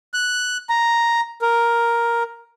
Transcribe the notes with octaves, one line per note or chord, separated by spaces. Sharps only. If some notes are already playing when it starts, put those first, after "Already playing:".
F#6
A#5
A#4